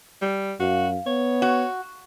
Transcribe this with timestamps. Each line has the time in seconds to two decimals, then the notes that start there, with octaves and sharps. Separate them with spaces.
0.22 G3
0.60 F#2 F#4 F5
1.07 B3 C#5
1.42 F#4